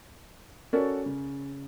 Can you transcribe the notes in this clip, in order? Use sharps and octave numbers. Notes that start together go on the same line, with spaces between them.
C#4 F#4 A4 A#4 C#5 D5
C#3